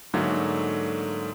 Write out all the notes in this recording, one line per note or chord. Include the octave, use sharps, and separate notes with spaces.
G#2 D3 F#3 A3 A#3